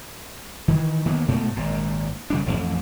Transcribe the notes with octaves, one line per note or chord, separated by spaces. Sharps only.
D#3 E3
D#3 A#3 B3
G#2 B2 A3
G#1 A#2
C#3 G3 D4
E1 A1 F2